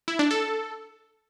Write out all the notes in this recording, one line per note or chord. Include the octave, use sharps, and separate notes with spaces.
E4
D4
A4